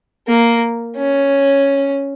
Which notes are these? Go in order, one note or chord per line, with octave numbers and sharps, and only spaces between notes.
A#3
C#4